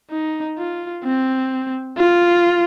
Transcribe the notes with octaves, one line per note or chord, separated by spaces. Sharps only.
D#4
F4
C4
F4